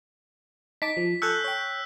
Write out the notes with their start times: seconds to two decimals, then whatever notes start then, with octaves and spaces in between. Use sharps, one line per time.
0.82 D#4 A5 D6 B6
0.97 F3
1.22 A4 G#5 C#6 E6 F#6 G6
1.44 C#5 G5